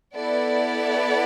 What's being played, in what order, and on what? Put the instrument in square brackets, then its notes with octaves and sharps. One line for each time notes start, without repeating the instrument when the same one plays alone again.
[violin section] B3 E4 A4 D5 F#5